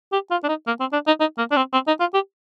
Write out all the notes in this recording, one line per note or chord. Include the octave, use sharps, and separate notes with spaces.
G4
F4
D4
D#4
A#3
C4
D4
D#4
D#4
A#3
D4
C4
C4
D#4
F4
G4